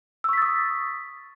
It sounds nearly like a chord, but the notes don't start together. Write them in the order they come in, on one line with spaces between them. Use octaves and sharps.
E6 C#6 B6 A6 D#6